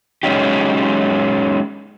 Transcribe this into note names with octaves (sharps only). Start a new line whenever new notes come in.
F#3 G#3 C#4 D#4 G4